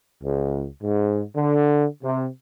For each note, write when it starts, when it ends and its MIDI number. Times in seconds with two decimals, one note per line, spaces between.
0.23 0.66 37
0.82 1.22 44
1.36 1.85 50
2.03 2.26 48